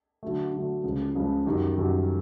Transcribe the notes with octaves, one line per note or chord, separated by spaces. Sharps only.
D3 F#3 A3
D3 F#3 A3
C#2 C#3 F3
C#2 C#3 F3
F#2 D#3 G3
F#2 D#3 G3